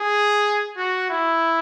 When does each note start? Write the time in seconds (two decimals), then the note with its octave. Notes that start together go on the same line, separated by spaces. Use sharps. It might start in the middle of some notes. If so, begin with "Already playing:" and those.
Already playing: G#4
0.77 F#4
1.10 E4